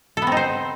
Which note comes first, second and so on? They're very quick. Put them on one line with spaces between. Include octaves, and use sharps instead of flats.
A4 B3 C4 D#4 C5